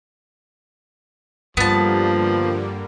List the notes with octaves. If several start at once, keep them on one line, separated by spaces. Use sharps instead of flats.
G2 D3 F3 G3 A#3 B3 A5